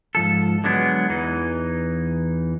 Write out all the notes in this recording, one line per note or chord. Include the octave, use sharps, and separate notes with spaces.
G#2 F3 A4
D3 F#3 G#3 B3 D4
E2 E3 D#4